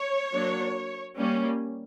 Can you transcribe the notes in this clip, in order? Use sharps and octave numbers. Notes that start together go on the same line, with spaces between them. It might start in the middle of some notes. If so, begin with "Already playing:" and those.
Already playing: C#5
F#3 A#3 D4
G3 A#3 C#4